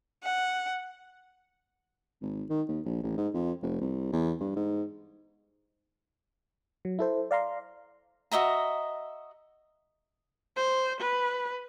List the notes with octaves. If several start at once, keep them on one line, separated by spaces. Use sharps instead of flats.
F#5
G#1
D#3
D#2
A#1
A1
G#2
F2
F1
C2
E2
G2
G#2
F#3
E4 A4 C5
D5 F5 A#5 C6
F#4 D#5 E5 A#5
C5
B4